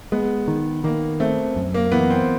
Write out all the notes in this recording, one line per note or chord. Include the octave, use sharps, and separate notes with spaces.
G#3 B3
D#3
D#3 A#3
A3 C4
F#2
A#3
E3 B3
C4